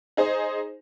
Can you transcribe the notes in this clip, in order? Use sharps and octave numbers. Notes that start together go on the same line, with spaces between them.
D#4 G#4 C5